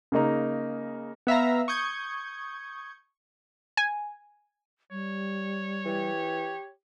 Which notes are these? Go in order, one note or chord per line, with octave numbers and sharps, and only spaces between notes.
C#3 A#3 D#4 A#5
B3 E5 F5 A#5
C#6 D#6 G6 G#6
G#5
G3 C#5
E3 G4